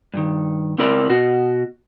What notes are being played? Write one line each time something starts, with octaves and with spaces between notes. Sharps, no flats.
G2 D#3
C#2 C4 E4 A#4 D5 B5
B2 F#4